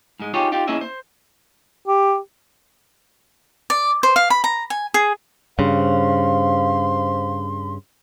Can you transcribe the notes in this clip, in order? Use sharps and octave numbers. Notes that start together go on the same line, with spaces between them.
G#2 G#3
D#4 F4 G4 G#4 C#5
D#4 F4 G4
A#3 C#4 E4 G#4 D#5 E5
C5
G4
D5
C5
F5
B5
A#5
G#5
G#4
G2 C#3 C5 F5 C6